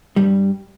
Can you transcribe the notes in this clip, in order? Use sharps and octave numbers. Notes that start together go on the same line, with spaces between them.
G2 G3